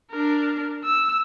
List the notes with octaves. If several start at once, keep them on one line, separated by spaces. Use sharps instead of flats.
D4 A#4
E6